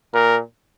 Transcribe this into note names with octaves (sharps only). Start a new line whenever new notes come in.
A#2 A#4